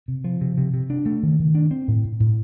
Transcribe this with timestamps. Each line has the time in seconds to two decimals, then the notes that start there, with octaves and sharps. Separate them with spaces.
0.08 C3
0.24 F3
0.41 C3
0.58 C3
0.74 C3
0.90 D4
1.06 A3
1.23 D#3
1.39 D#3
1.55 D4
1.71 C4
1.88 A2
2.05 A2
2.20 A2